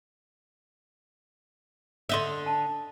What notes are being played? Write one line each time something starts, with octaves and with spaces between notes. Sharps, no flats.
D3 C#5 D#5 E5 C6
A5